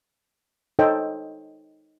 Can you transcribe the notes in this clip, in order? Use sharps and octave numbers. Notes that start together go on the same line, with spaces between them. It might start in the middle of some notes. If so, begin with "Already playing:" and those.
D#4 A4 C5 C#5 D#5 G5